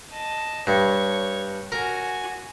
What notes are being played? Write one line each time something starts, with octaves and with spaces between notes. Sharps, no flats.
D#5 A5
G2 C#5 C#6
F#4 A#4 G#5